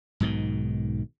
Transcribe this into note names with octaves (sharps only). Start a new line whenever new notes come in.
B1 G#2 B2 D#3